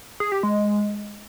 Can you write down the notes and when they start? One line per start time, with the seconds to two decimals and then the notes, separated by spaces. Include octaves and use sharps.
0.20 G#4
0.32 G4
0.43 G#3